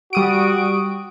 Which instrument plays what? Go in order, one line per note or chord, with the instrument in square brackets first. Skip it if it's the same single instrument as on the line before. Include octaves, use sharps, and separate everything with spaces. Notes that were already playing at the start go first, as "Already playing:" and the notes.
[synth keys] G3 D#6 D7 [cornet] F#4